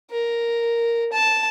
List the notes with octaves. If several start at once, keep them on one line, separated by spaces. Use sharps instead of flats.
A#4
A5